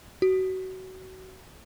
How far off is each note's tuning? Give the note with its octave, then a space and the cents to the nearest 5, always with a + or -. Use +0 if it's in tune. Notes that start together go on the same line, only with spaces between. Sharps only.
F#4 +25